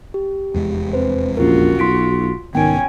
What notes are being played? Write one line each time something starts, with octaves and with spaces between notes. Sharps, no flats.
G4
F1 E2 G#3
C4 B4 C5
A#1 C#4 F4 F#4 A#4
B1 C6 B6 D7
C2 G#2 D#3 B3 C#4 G5 G#5 D7